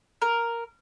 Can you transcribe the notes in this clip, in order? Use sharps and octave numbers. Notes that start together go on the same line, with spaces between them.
A#4